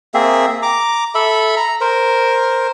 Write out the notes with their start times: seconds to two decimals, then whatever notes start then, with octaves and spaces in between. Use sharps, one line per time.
0.14 A#3 C4 G#4 E5
0.62 A#5 D6
1.15 A4 E5 B5
1.57 A#5
1.81 A#4 C5